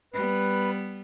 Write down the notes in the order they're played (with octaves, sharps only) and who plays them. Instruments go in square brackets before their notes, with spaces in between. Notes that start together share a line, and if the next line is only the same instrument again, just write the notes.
[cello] G3 B3 [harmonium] B4